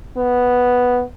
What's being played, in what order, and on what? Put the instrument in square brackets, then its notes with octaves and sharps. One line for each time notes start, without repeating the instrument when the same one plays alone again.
[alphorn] B3